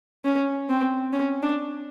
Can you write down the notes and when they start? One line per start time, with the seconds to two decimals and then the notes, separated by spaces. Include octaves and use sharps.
0.25 C#4
0.70 C4
1.13 C#4
1.43 D4